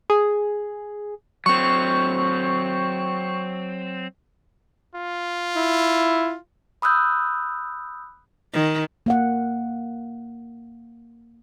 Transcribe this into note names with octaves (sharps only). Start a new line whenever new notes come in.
G#4
F#3 C4 C#6
F4
E4
B5 D#6 E6 F#6 G6
D#3
A#3 F5 F#5